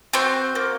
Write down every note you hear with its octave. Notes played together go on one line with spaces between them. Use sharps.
C4 F#4 C5
A#3